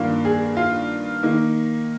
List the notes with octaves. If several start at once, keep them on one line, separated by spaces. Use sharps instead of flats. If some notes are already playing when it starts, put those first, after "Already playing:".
Already playing: G2 D#3 A#3 F4
G#4
F4
D#3 A#3 D#4